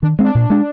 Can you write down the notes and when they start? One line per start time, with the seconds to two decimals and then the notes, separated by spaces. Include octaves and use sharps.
0.02 D#3 D4
0.19 G#3 C4 D4
0.35 A#2
0.50 G#3 D4